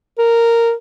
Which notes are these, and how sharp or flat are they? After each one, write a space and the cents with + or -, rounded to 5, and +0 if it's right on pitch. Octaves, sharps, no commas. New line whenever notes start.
A#4 -10